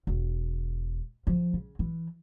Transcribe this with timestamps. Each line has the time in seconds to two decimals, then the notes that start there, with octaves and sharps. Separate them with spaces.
0.07 E1
1.27 F3
1.53 C#3
1.79 E3